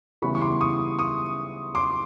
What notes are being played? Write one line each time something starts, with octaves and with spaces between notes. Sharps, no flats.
C#3 E3 G3 B3 B5 C#6
C#6
C6 D6
C#6 D#6
C#6 D#6
C6 D6